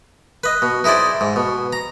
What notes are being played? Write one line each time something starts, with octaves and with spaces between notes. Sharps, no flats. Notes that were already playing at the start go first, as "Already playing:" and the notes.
B4 D#5
B2
D#4 E4 G#4 C5 D5
G#2
B2
A#5